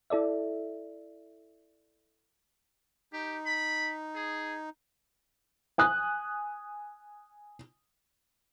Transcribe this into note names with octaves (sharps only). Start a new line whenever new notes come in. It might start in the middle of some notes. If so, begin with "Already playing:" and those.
E4 A4 D5 E5
D#4 G4
B5
G#4
G#5 D#6 F#6